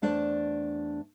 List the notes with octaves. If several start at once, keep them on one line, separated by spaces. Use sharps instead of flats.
E2 A3 D4 C5 D5 A5